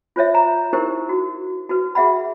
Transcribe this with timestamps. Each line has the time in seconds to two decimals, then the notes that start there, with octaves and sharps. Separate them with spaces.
0.16 F4 C5 C#5 E5
0.35 A#5
0.73 D#4 E4 G4 A#4 C5
1.09 F#4
1.69 F#4 B4
1.95 G#4 E5 F#5 B5